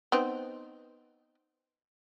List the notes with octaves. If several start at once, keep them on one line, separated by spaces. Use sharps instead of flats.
B3 C4 D#4